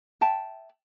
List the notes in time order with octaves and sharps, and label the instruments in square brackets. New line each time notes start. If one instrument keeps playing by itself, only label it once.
[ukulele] E5 G5 A5